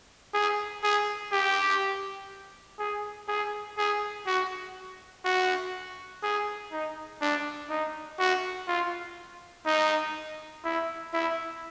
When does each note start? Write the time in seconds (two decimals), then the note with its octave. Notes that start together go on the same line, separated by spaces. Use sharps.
0.34 G#4
0.83 G#4
1.32 G4
2.79 G#4
3.28 G#4
3.77 G#4
4.26 F#4
5.25 F#4
6.23 G#4
6.72 D#4
7.21 D4
7.70 D#4
8.19 F#4
8.68 F4
9.66 D#4
10.64 E4
11.13 E4